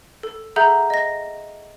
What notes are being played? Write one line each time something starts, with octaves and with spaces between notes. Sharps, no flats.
A4
G#4 A4 E5 F#5 A#5 G6
D#5 A#6